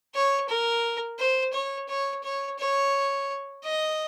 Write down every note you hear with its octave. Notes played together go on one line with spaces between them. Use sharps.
C#5
A#4
C5
C#5
C#5
C#5
C#5
D#5